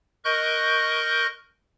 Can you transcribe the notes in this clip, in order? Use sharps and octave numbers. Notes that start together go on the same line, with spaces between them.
A#4 D#5 C#6 F#6 G6